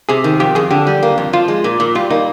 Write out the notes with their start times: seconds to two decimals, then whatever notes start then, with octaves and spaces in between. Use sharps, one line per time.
0.09 C3 G#4
0.24 D#3
0.40 F2 G4
0.55 F2 G#4
0.71 D3 G4
0.87 G3
1.03 A#3
1.18 F2
1.33 F3 F4
1.48 G#3
1.64 A#2
1.80 A#2
1.95 G3 F4
2.11 A#3 D#4